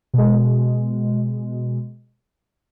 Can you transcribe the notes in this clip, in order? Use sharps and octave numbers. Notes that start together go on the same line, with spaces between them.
B2 G#3